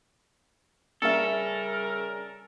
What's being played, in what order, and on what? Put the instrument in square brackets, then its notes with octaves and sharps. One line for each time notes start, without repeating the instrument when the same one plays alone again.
[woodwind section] C#3 G3 A#4 [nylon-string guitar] C#4 E5 [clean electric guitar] A4